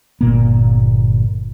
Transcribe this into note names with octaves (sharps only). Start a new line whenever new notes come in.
G1 A#2 A#3